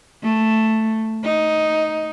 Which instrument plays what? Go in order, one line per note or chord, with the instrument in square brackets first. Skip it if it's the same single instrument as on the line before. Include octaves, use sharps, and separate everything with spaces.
[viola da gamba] A3
D#4